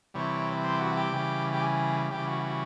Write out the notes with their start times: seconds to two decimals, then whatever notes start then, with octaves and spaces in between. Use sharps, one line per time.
0.14 C3 E3 G3 C#5
0.64 C5
0.80 F#4
0.97 G4
1.13 C#3 E3 G3
1.54 G4
1.62 G#4
2.11 C#3 E3 G3 G4
2.27 F#4
2.44 F#4